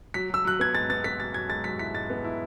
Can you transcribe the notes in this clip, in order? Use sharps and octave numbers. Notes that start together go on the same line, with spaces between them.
F#3 B6
F#3 E6
F#3 F#6
B3 G#6
G#2 A6
B3 A6
B3 B6
F#3 A6
F#3 G#6
G#2 A6
F#3 B6
E4 B6
G#2 A6
B3
E4